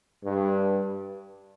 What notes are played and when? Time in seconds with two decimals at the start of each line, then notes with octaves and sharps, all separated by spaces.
0.24 G2